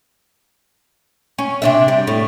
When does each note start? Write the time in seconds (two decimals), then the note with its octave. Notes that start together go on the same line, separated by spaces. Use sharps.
1.38 C#4
1.62 C3 D4 E5
1.88 G3
2.07 A2